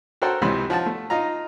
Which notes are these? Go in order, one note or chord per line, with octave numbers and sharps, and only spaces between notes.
F#4 A4 A#4 C5 G5 A5
C#2 C3 E3 C#4 B5
F3 F#5 A5
A3
D#4 F4 A#5